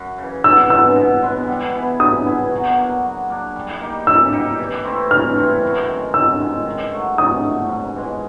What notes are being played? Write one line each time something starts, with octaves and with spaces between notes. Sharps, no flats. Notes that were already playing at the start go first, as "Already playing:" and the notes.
Already playing: F#2
C#3 E3
B2 E6
G#3 B3 E6
B2
G#3 B3
G3
B3 E4 G#4
G3 D#6
B3 E4 G#4
F#3
A#3 D4
F#3
A#3 D4
G3
A#3 D#4 G4
G3 E6
A#3 D#4 G4
E3
A3 C4 E4
E3 F6
A3 C4 E4
F#2
D#3 G#3
F#2 E6
D#3 G#3
D#3
F#3 A3
D#3 D#6
F#3 A3
G#2
E3 G#3